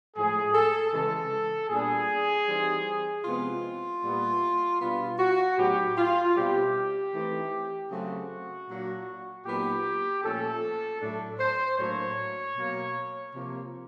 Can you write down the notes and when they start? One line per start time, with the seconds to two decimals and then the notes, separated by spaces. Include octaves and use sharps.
0.16 A2 F3 G#3 G#4
0.54 A4
0.92 C#3 E3 G#3 C#4 A4
1.70 A#2 G3 B3 D4 G#4
2.47 E3 G3 C4 D#4
3.25 C3 F3 G#3 B3 E4 F4
4.03 A#2 G3 B3 E4
4.80 B2 G3 B3 D4 F4
5.19 F#4
5.58 A2 F#3 B3 D#4 G4
5.97 F4
6.36 B2 G3 C4 E4 G4
7.13 E3 A3 C4 D#4
7.91 C#3 F#3 A3 C4 F#4
8.68 A#2 F#3 A#3 D4
9.46 A#2 F#3 B3 D#4 G4
10.23 A#2 F3 A3 C#4 A4
11.01 A2 F#3 A3 D4
11.39 C5
11.78 A2 F#3 A#3 D4 C#5
12.55 B2 F#3 A#3
13.33 C3 F3 A#3